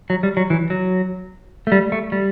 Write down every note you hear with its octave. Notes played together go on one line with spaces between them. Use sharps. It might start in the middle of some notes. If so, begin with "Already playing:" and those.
F#3
G3
F#3
E3
F#3
A3
G3
A3
G3